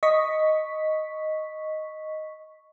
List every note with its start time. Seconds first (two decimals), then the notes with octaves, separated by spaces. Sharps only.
0.03 D#5 C#6 B6